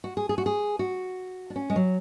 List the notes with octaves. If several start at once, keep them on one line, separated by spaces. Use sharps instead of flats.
F#4
G#4
G#4
F#4
G#4
F#4
D4
C#4
G#3
F#3